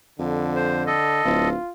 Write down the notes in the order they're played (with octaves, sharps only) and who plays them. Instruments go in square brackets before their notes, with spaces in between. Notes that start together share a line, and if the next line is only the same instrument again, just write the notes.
[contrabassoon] F2 [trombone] D3
[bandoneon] C5
A4 D#5
[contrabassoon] D1 [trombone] F4